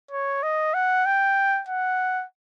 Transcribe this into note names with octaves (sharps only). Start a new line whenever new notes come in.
C#5
D#5
F#5
G5
F#5